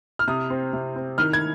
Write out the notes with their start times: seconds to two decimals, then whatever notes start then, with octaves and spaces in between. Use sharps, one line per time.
0.19 F6
0.27 C3 D#6
0.50 C4
0.73 C3
0.96 C4
1.18 D#3 F6
1.33 G#6